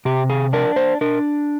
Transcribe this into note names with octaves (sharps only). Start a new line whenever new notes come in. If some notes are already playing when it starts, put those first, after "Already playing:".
C3 G4
G#4
D4 A#4
C5
D4 A#4